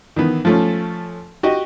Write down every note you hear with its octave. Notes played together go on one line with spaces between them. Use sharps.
D#3 E3 B3
F3 A3 C#4
F#4 G4 D#5